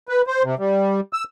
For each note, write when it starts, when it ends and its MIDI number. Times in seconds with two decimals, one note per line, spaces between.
0.09 0.22 71
0.27 0.43 72
0.43 0.55 48
0.59 1.00 55
1.13 1.24 88